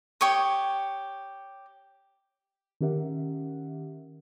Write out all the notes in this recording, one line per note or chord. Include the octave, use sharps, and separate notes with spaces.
G4 C#5 C#6 D#6
D#3 C#4 G4 A#4 E5 F#5